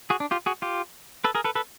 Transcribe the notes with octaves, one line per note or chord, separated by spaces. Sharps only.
F#4 G#4
D4
F4 G4
F#4 G#4
F4 G4
A4 B4
G#4 A#4
A4 B4
A4 B4